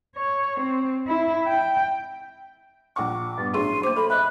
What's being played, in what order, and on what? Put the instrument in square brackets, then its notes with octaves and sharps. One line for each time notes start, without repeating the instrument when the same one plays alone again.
[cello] C#5
C4
E4
G5
[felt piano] A#1 F#5 C#6 [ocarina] D6
[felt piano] G2 B3 [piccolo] A6
[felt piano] A1 F#3 [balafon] D4 G#4 C#6 [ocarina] C6 [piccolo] D#7
[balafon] A#3 D6 [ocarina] C5
[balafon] A4 [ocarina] B5
[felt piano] D#5 E5 [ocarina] B5 [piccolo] F#6